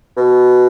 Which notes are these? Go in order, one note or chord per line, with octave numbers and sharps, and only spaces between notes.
B2